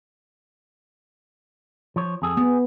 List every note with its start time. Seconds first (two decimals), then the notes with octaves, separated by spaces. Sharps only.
1.96 F3 C#5
2.22 F2 G#4 A4
2.37 B3 G#4